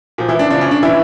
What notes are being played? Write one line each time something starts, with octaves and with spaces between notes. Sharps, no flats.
A#2 F3
E3 E4
D4
C#3 F3 D4
C#4
D4
A2 E3 E4